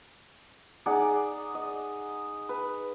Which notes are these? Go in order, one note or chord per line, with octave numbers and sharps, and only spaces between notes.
D#4 G#4 D5 F#5
D#5
B4